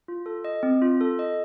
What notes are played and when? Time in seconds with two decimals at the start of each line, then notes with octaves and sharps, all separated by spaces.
0.08 F4
0.26 A4
0.45 D#5
0.63 C4
0.82 F4
1.01 A4
1.19 D#5